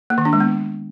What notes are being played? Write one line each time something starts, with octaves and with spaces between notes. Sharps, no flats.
A#3
D#3
D4
G#3
B3